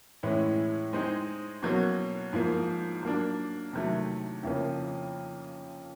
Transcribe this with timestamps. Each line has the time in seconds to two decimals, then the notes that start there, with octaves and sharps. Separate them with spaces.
0.23 A2 E3 G#3 C#4 E4
0.93 G#3 C4 D#4 G#4
1.63 B2 F#3 A#3 C#4 F#4
2.33 G#2 F3 A#3
3.03 F#3 A#3 D4
3.73 C3 D#3 F#3 A3
4.43 F2 C#3 F3 A#3 C#4